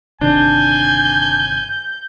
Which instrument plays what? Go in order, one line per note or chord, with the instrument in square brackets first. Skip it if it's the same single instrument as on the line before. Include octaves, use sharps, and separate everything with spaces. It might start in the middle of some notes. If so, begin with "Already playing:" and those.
[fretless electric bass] G1 C3 D#3 [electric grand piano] D4 [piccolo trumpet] G#5 [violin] G6